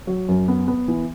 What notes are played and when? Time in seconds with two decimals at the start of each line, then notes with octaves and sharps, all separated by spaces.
0.07 F#3
0.28 F#2
0.48 B3
0.68 B3
0.88 E3